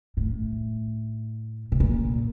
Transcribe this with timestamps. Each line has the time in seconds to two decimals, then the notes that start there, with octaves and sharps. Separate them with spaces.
0.17 A2
1.72 B2
1.80 A#2